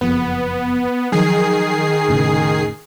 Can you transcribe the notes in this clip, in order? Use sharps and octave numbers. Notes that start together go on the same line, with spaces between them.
F#1 F2 B3
D#3 F3 F#3 G#4 C7
F1 A2 C#3